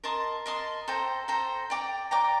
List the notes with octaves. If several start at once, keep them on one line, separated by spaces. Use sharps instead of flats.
A#4 D#5 A5 C6
A#4 D#5 A5 C6
A4 C5 G5 A#5
A4 C5 G5 A#5
D5 G5 A#5 D6
D5 G5 A#5 D6